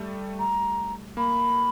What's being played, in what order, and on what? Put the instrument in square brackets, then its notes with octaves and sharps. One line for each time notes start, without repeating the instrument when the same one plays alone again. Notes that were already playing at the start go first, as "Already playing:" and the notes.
Already playing: [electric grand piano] G3 A3
[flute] A#5
[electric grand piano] A#3 [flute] B5